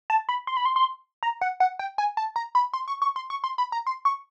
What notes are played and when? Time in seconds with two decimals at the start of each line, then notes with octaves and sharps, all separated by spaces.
0.10 A5
0.29 B5
0.47 C6
0.57 B5
0.66 C6
0.76 C6
1.23 A#5
1.41 F#5
1.60 F#5
1.79 G5
1.98 G#5
2.17 A5
2.36 A#5
2.55 B5
2.73 C6
2.88 C#6
3.02 C#6
3.16 C6
3.30 C#6
3.44 C6
3.58 B5
3.72 A#5
3.87 C6
4.05 C#6